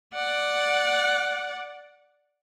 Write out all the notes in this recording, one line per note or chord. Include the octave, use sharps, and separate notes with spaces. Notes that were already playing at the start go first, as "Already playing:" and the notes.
D5 F#5